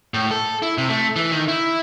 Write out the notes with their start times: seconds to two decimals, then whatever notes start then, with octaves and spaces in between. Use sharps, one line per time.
0.14 A2
0.31 A4
0.62 E4
0.78 C3
0.89 A3
1.16 E3
1.32 D#3
1.48 E4